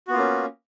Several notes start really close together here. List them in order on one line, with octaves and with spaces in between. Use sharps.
F#4 B3 F4 A#3 C#4